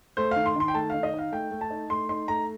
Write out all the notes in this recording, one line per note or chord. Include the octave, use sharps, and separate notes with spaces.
A3 C5
D#3 F5
C6
D#3 C6
G5
A3 A5
D#3 F5
D#5
D#4 F5
A3 G5
A3
A5
D#4
A3 C6
D#4 C6
A3 A#5